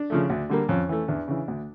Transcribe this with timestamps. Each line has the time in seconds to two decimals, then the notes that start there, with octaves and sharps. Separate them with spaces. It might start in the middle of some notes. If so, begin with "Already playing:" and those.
Already playing: D4
0.10 C#3 F3 A3
0.30 D2
0.50 D3 G3 A#3
0.69 F2 C#4
0.89 E3 A3
1.08 E2 D4
1.28 C#3 E3
1.48 D2